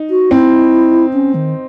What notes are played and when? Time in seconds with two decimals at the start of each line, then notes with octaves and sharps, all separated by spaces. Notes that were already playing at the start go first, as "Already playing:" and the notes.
Already playing: D#4
0.10 F#4
0.31 C4 E4
1.13 C#4
1.35 D#3